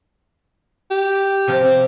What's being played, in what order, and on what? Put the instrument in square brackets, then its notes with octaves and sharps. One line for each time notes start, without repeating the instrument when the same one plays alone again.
[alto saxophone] G4
[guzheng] C3 F3 F4
[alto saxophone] C4